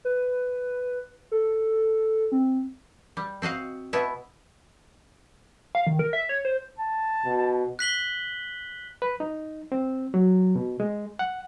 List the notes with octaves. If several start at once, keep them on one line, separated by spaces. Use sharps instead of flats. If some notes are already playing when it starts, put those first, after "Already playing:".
B4
A4
C4
G3
C4 F#4 D#5 F5
B2 B3 E4 E5
F5
D#3
A#4
E5
C#5
C5
A5
B2
F#6 B6 F#7 G7
B4
D#4
C4
F#3
B2
G#3
F#5